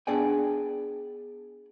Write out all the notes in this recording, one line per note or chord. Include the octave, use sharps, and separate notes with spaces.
B3 D4 G#4 D5 G5 G#5